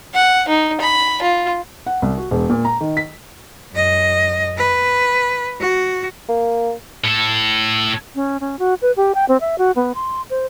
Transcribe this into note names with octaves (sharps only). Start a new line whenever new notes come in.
F#5
D#4
B5
F4
F#5
C2
F#4
E1
A#2
A#5
D#3
B6
F#2 D#5
B4
F#4
A#3
A2 A4
C#4
C#4
F#4
B4
G4
G5
C4
E5
F#4
B3
C6
C5